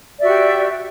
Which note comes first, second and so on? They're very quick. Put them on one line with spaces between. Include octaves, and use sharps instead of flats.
D5 E5 F#4 G4